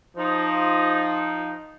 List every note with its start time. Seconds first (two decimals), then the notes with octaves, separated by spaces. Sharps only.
0.16 F3 D#4